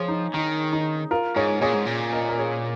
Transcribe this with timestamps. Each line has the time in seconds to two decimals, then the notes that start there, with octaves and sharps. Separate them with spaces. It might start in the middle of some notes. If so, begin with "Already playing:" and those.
Already playing: F3 G#4 C#5
0.08 D#4
0.34 D#3 D#4
0.73 D#4
1.11 F4 A#4
1.36 G#2 G#4 C#5
1.62 A#2 G#4 C#5
1.74 G#2
1.87 A#2
2.13 A#4 D#5
2.29 A#4
2.39 G#4 C#5